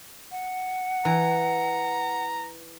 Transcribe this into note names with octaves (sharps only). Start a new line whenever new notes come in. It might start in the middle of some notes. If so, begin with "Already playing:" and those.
F#5
E3 A#5